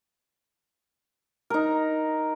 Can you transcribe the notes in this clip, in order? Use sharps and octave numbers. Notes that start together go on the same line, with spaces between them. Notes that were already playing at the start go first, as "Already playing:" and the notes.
D#4 A#4